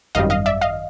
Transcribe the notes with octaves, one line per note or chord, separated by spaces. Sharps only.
G#1 F#2 D#3 G3 D#5 F5
D#5 F5
D5 E5
D#5 F5